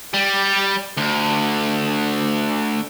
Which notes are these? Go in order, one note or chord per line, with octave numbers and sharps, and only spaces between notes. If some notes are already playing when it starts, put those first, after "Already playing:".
G3
D2